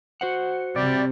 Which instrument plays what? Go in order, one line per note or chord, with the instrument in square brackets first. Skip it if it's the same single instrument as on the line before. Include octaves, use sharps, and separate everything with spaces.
[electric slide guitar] F#4 C5 F#5
[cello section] C3 [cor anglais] G3 [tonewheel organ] D5